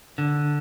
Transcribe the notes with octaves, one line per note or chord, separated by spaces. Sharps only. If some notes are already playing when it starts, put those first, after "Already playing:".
D3